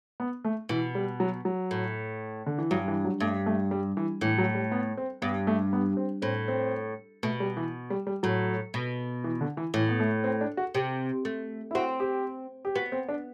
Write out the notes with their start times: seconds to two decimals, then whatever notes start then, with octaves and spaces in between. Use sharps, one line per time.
0.20 B3
0.45 A3
0.69 B2 E3
0.95 G3
1.20 F#3
1.45 F#3
1.71 A2
2.46 D3
2.58 E3
2.71 G2 F#3
2.88 E3
3.05 F#3
3.20 G2 A3
3.46 A3
3.71 G3
3.97 E3
4.21 A2 E3
4.38 F#3
4.55 G3
4.72 B3
4.97 C4
5.22 G2 B3
5.47 A3
5.73 B3
5.97 C4
6.22 A2 C4
6.48 C4
7.23 B2 A3
7.40 G3
7.57 E3
7.90 G3
8.07 G3
8.23 A2 F#3
8.74 B2
9.24 E3
9.41 D3
9.57 E3
9.74 A2 E3
9.89 B3
10.00 A3
10.24 C4
10.41 D4
10.57 F#4
10.74 C3 G4
11.25 A3
11.71 E4
11.75 C4 F#4
12.00 G4
12.65 G4
12.75 B3 F#4
12.92 C4
13.09 D4